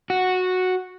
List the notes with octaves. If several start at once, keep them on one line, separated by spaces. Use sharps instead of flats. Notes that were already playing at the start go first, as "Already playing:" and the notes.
F#4